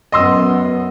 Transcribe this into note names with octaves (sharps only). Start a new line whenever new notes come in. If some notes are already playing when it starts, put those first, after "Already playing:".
F#2 B3 D#5 C6 E6